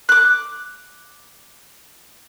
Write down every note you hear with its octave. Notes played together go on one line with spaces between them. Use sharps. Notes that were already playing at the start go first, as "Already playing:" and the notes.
D6 F#6